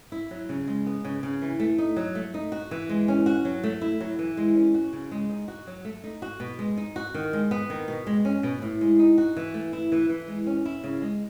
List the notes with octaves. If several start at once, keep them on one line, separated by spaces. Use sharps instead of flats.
E4
F#3
C#3
G#3
B3
C#3
C#3
E3
A3
D#4
F#3
A3
D#4
F#4
E3
G#3
C#4
F#4
F#3
A3
E4
F#3
E3
G#3
C#4
F#4
C#3
G#3
D#4
F#4
F#3
A3
D#4
F#4
B2
G#3
D#4
F#4
D#3
G#3
B3
D#3
B2
G#3
C#4
B2
A2
G#3
D#4
F#4
E3
A3
E4
E3
E3
G#3
C#4
E4
C#3
G#3